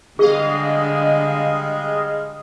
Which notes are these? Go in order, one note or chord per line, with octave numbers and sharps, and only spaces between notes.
D3 G3 G#3 G#4 D#5 F5